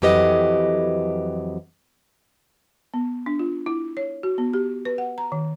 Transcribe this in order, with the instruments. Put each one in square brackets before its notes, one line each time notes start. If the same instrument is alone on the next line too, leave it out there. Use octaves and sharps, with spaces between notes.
[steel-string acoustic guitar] F2 E3 F#3 G4 B4 D#5
[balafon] B3
D4
F4
E4
C#5
F#4
B3
G4
B4
F#5
A#5
D#3